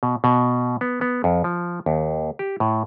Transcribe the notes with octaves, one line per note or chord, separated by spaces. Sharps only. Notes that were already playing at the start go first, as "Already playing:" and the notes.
B2
B2
B3
B3
F2
F3
D#2
G4
A2